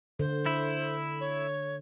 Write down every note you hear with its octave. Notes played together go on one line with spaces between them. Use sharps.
D3 C5
E4
C#5